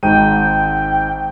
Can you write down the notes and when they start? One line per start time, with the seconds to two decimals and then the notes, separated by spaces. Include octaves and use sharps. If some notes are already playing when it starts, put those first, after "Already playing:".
0.03 G#1 G#2 G5 D#7